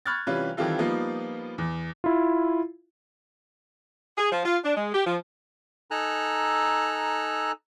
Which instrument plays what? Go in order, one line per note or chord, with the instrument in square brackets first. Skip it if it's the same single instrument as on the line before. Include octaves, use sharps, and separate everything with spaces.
[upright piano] B5 C#6 F6 F#6 G#6 A6
C3 E3 G3 C#4 F4 B4
D#3 E3 G3 C4 F4 A4
F3 G3 A#3 B3 D#4 F4
E2
[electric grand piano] E4 F4
[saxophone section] G#4
F3
F4
D4
G#3
G4
F3
[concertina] D#4 A4 G#5 A#5 E6 F#6